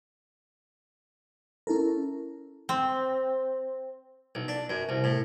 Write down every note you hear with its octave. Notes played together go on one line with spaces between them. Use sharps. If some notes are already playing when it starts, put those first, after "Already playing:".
C#4 E4 A4 A#4
C4
B1
D4
F#2
C2
A2